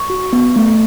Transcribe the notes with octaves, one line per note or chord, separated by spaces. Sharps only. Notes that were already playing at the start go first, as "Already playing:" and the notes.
Already playing: C#6
F#4
B3
A3